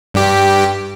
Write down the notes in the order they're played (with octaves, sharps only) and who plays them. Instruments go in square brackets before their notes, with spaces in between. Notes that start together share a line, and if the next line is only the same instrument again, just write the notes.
[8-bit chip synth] G2 G4